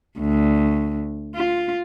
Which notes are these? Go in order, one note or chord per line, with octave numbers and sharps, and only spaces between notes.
D2
F4